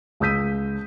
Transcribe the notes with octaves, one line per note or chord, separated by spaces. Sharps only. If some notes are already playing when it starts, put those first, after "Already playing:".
C#2 D#6 E6 G6 B6 D#7